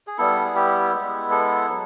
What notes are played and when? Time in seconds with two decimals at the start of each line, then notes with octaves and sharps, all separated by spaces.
0.07 G#4
0.18 G3 B3 E4 A4
0.46 G#4
0.55 G4
0.94 G#3 B3 E4
1.31 A4
1.69 F#3